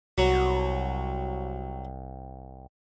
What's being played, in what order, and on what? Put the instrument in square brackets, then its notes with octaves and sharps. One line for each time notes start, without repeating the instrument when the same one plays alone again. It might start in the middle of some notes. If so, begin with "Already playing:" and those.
[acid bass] C2 [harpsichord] F#3